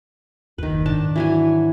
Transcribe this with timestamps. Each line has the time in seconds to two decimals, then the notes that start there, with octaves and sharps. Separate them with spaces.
0.58 F#1 D#2 D#3 B4
0.86 G#2 B2 D#3 D4 A5
1.16 E3 F#3 G#5